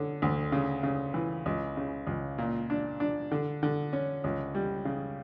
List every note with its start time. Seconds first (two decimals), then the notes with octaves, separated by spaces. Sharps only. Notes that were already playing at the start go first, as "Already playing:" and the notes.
Already playing: D3 C#4
0.22 D2
0.52 C#3
0.83 C#3
1.14 E3
1.46 C#2
1.77 C#3
2.07 C#2
2.38 A#2
2.70 D4
3.00 D4
3.31 D3
3.63 D3
3.93 C#4
4.24 C#2
4.55 G3
4.85 C#3